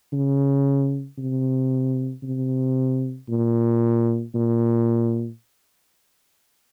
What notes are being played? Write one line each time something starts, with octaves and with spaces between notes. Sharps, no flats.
C#3
C3
C3
A#2
A#2